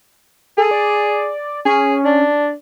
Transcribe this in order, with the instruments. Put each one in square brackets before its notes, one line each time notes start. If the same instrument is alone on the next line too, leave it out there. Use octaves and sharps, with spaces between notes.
[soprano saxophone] G#4 [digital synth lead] A4
[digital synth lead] D5
[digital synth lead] C#4 [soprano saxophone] G#4
[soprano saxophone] D4